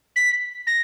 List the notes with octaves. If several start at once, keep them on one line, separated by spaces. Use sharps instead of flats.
B6
A#6